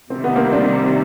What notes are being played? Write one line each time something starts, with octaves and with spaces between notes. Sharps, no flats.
C3 D#3 G3 C4
B3
A#3 C4
C4 D4